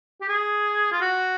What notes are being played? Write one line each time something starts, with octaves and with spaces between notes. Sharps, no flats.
G4
G#4
F4
F#4